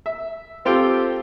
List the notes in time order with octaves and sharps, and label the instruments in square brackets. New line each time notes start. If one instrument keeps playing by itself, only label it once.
[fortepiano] E5
C4 F4 G4 A4 G5